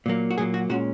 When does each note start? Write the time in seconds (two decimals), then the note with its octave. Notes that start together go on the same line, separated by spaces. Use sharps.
0.06 A#2 F#3 A#3
0.31 F#4
0.38 A#2 F#3 A#3 G#4
0.54 F#4
0.69 A#2 G#3 C#4 F#4